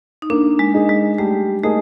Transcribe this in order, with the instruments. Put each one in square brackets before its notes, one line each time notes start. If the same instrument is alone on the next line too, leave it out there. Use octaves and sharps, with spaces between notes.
[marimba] D#4
[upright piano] A#3 [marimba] D4
[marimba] G#3
[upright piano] D#4 G#4
[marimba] G#3
[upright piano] G3 [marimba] A3
[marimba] A3 [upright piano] A#3 D#4 G#4